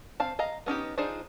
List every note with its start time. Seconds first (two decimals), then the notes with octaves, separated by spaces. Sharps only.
0.20 C4 F5 A5
0.39 D#5 F5 A#5
0.66 B3 C#4 D#4 G4
0.98 D4 D#4 F4 G#4 C5